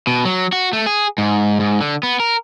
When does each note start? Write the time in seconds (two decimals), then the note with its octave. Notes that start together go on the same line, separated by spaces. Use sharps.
0.07 B2
0.25 F#3
0.52 F#4
0.73 A3
0.86 G#4
1.18 G#2
1.60 G#2
1.81 D3
2.03 B3
2.20 A#4